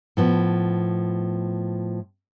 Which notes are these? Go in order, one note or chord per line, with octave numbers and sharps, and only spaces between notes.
A2 F3 B3